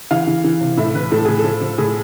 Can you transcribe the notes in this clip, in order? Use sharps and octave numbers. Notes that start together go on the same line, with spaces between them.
E3 F5
E3
E3
C3
A2 E5
E3 B4
A2 A4
A2 G#4
A4
F3
F3
A2 G#4